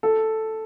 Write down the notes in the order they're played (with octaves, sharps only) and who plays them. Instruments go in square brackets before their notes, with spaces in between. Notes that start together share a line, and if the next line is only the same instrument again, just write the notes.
[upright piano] A4